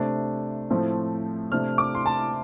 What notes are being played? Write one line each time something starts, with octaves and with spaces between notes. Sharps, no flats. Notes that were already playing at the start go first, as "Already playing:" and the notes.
Already playing: C3 A3 D4
A2 F3 A3 C4
C3 A3 D4 F6
D6
C6
A5